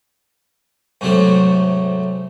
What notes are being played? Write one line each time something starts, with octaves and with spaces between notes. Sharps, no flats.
G#2 C3 F#3 A3